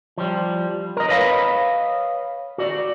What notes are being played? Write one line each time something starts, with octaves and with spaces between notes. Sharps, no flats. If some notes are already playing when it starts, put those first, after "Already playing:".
F3 G3
A#4 D#5
B4 C#5 D#5 F5 A5 B5
F#4 D5